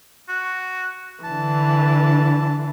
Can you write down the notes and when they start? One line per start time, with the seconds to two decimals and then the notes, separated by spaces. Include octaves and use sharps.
0.28 F#4
1.24 D3 E3 A5